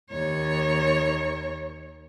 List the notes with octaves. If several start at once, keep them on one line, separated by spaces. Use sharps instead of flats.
D#2 C#5